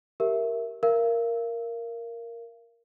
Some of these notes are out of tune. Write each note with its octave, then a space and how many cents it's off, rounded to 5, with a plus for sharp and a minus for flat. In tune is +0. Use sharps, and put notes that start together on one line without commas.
G4 +0 A#4 +0 E5 +0
A#4 +0 F5 -40